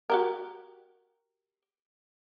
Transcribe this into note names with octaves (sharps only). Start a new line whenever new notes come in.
F#4 G4 A#4